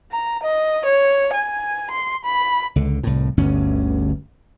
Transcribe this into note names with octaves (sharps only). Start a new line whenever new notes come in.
A#5
D#5
C#5
G#5
C6
B5
C#2 D3
C2 A2
G1 D2 G2 C#4